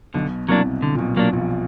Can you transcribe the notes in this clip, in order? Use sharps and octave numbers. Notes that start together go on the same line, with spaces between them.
B1 B2 D3
C2 C3 F#3 A#3 D4
D3
A#2
B1 B2
F#3 A#3 D4
A#1 A#2